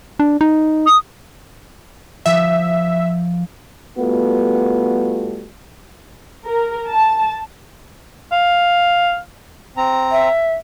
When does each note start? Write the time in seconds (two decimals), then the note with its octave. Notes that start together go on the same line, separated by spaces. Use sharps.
0.20 D4
0.41 D#4
0.86 D#6
2.26 F3 E5
3.97 G3 A3 B3 F4 F#4
6.46 A#4
6.89 A5
8.32 F5
9.77 C4 A#5
10.12 E5